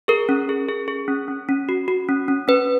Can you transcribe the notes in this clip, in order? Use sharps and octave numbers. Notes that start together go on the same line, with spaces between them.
G#4 A#4
C#4
G#4
G#4
G#4
C#4
C#4
C#4
F#4
F#4
C#4
C#4
C#4 B4